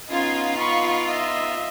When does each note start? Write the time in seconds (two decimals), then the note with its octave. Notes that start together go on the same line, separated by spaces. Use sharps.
0.10 B3 C#4 D#4 F4 G#6
0.57 B5 C#6
1.09 D#5 E5